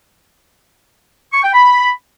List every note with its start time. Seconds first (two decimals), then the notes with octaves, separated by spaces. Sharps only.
1.33 C#6
1.43 G5
1.54 B5